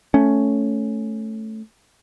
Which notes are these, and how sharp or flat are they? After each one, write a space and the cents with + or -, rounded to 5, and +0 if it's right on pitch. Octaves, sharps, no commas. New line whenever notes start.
A3 +0 C#4 +0